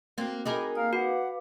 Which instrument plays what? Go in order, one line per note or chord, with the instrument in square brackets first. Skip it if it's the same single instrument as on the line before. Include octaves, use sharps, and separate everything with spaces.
[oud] A#3 C4 [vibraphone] F#4 G5
[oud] D#4 G#4 A#4 [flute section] B5 D6
[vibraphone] A#3 D#6 [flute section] F5 A#5 F6
[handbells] F#4 [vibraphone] B4 F5 D6 [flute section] F#5